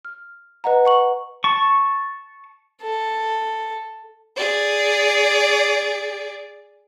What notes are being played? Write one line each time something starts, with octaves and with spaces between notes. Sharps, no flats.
F6
B4 D#5 F#5 A#5
F#5 C#6 F#7
A5 C#6
A4
G#4 D5